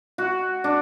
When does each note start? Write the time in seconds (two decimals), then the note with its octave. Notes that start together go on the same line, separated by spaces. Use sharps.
0.18 F#4
0.64 D4